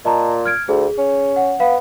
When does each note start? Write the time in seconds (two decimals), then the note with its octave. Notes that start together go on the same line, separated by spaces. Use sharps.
0.05 A#2 D#5 A5 A#5
0.45 F6 G#6 D7
0.68 D2 G#4
0.98 C#4
1.36 F#5
1.60 B3 F5